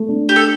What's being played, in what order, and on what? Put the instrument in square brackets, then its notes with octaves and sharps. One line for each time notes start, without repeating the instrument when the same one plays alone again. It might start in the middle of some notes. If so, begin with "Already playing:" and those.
Already playing: [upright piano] A3
D4
[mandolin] G4
A4